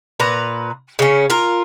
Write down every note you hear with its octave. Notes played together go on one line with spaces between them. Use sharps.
A#2 B4 A#5
C#3 C#4
F4 A#4